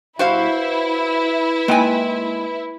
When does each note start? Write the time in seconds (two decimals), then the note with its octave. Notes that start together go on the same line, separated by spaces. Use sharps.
0.19 B2 G3 E4 F#4 C5 F5
0.49 B4
1.68 G#3 A#3 D#4 G5 G#5